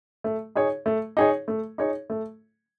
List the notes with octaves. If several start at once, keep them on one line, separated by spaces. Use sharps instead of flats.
A3
D#4 G#4 C#5
A3
D#4 G#4 C#5
A3
D#4 G#4 C#5
A3